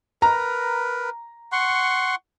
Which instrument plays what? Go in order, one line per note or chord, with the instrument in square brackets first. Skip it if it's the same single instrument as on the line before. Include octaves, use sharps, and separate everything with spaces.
[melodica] A#4 B4 [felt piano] A#5
[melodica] F#5 C6 C#6